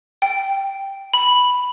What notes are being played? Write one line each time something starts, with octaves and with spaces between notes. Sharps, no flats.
G5
B5